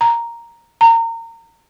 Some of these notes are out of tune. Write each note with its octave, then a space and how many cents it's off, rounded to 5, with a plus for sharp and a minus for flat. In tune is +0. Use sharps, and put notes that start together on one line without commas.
A#5 +0
A#5 -30